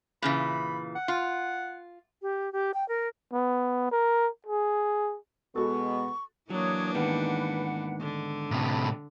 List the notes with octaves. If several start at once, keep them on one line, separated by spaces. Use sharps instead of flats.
A#2 C#3 E3 B5
F#5
F4
G4
G4
G5
A#4
B3
A#4
G#4
B2 G#3 B3 F#4 A4 C#6
E3 F#3 A#3 D4 C#5 D#6
G#2 D#3 B3 B4 F#5
D3
A2 C3 B5